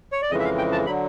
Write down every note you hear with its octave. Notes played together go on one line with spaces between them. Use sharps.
C#5
D5
F2 C#3 E3 G#3 D#5
E5
F5
G5
A5
D3 F#3 B5